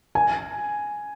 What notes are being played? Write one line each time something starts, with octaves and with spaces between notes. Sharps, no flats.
G#5